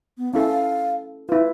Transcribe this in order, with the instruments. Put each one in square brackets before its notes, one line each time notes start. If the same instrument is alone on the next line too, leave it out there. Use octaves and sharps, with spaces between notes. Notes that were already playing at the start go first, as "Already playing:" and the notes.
[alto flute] B3
[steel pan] C#4 E4 A4 [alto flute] F5
[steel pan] E4 F4 [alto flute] B4